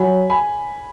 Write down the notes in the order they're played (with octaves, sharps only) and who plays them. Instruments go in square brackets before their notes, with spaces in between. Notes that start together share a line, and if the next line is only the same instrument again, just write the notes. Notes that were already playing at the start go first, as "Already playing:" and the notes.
Already playing: [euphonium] F#3 [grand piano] G#5 B5
[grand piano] G#5 B5